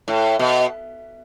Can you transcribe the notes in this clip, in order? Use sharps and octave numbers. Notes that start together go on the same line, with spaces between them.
A2
B2